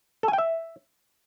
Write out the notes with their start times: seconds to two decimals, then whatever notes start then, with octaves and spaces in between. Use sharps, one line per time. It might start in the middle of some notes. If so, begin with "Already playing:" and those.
0.23 A4
0.28 G#5
0.33 G5
0.38 E5